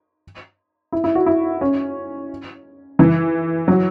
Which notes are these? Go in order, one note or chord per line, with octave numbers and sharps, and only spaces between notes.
E4
E4
F#4
E4
C#4
E3
F#3